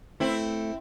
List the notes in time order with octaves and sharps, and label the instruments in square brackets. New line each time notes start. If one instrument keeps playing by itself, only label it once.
[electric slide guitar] A3 [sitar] C4 E4